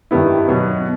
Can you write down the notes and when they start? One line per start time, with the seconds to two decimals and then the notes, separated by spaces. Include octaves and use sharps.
0.11 G2 D#3 G3 B3 E4
0.48 B2 F#3 B3